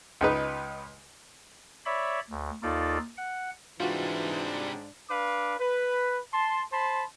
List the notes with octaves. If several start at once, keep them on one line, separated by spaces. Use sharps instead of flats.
C#2 D#4 B4
C#5 D5 E5 B5
D2
D#2 D#4 F4 A4 D5
F#5
G#2 C3 E3 G3 D4 F4 F#4
D4 B4 F5 D6
B4
A5 C6
C5 A5 B5 C6